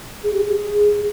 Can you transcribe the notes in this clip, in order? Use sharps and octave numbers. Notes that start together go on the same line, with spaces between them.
G#4
G4
G#4